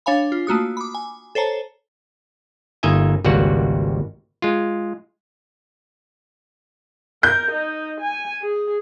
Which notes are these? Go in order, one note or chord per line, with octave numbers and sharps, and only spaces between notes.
D4 C#5 F5 G#5 B5
F4
A3 A#3 F#4 D#6
B5 D6
G#5
A4 C5 C#5 A5 A#5
G1 A#3 D#4 D#5 E5 G#5
G#1 C#2 G3 A#3 F#4 F#5
G#3 F4
A#4 G6
D#4
G#5
G#4